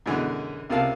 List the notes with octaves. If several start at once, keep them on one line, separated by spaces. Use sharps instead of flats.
F#2 B2 D3 E3 G#3
C#2 C3 F4 A#4 F5 A5